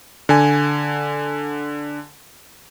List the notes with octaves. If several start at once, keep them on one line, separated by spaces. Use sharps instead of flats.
D3 G#5